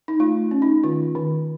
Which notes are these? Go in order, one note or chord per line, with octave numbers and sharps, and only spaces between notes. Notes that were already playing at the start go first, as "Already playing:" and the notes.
D#4
A3 F4
C#4
D#4
D#3 F4
D#3